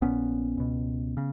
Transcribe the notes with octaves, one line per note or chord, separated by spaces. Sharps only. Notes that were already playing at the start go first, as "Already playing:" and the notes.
A#1 A#2 B3 C#4
C#2 B2
C#3